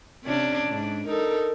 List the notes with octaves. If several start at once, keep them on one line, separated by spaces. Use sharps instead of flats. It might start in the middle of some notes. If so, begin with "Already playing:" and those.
C3 C#4 D4
G#2 D4
D#4 A4 A#4